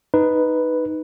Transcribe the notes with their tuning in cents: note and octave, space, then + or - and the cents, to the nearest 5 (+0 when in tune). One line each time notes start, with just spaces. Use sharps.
D#4 +0 B4 +0